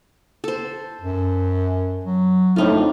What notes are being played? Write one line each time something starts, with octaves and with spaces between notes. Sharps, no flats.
A4 C5
F#2
F#3
F2 A2 D4 D#4 F4